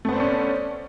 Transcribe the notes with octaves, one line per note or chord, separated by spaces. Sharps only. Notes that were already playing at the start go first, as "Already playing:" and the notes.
A3 B3 C#4 D4 C5